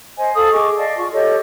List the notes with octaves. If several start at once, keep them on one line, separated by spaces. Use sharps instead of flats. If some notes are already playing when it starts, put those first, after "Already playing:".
C5 D#5 G#5
A4 F5 D#6
G#4 D#5 C#6 D6
D5 D#5 F5 A5
F4 C#6
G4 A4 C#5 D#5